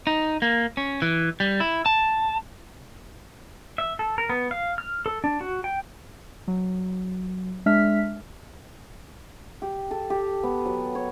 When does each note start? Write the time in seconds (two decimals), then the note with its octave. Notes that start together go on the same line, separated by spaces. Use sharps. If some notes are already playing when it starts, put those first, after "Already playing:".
0.07 D#4
0.42 A#3
0.77 C#4
1.02 E3
1.40 G3
1.60 E4
1.86 A5
3.78 E5
3.99 A4
4.18 A#4
4.29 B3
4.51 F5
4.78 F6
5.06 A4
5.24 D4
5.41 F#4
5.64 G5
6.48 F#3
7.66 G#3 D4 E5 F6 B6
9.62 G4
9.91 A4
10.10 G4
10.43 B3
10.65 F#3
10.95 C#5